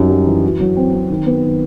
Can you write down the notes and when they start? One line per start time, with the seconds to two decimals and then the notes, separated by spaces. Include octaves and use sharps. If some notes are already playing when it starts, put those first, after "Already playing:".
Already playing: F#2 G3 D#4
0.10 G3
0.27 E3
0.43 F#4
0.60 F#3
0.77 C4
0.94 C4
1.10 D#3
1.26 B3
1.44 D#3